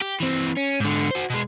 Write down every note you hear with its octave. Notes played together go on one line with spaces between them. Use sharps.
G4
E3 C4
C#4
G#2 D3
F#4 C5
B2 G#3